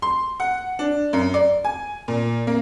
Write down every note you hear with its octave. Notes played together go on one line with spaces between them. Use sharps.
C6
F#5
D4
F#2
D5
G#5
A#2
A#3